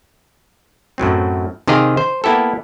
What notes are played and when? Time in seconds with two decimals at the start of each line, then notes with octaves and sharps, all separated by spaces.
0.98 F#2 A2 F#3 C4
1.67 C3 D#3 G4 G#4 D#5 F5
1.97 C5
2.24 A#3 B3 E4 G4 A4